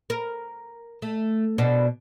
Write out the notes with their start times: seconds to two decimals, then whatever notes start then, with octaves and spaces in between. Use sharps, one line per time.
0.10 A#4
1.02 A3
1.58 B2 D4